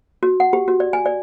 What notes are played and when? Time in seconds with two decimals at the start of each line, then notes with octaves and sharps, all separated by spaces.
0.23 F#4
0.40 F#5
0.53 G4
0.68 F#4
0.80 D5
0.93 G#5
1.06 D5